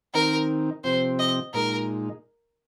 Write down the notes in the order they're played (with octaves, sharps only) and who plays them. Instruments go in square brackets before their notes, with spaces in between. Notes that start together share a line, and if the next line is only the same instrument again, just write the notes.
[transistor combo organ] D#3 C4 D#4 [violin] A#4
[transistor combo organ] C3 F3 C4 [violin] C5
[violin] D#5
[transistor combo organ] A#2 G#3 D#4 [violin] A#4